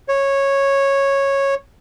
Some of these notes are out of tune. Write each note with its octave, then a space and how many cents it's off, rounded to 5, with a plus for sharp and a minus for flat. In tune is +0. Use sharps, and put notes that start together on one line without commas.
C#5 -10